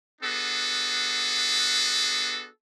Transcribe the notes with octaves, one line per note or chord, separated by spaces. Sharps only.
B3 D4 F#4 G#4 A4